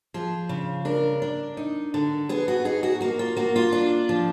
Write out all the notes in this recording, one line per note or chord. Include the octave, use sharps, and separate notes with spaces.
F3 G#4
C#3
D4 A#4
D4
D#4
D3
B3 G#4
F#4
D#4 G#4
F#4
A#3 F#4
F4
A#3 F#4
F4
D4
F3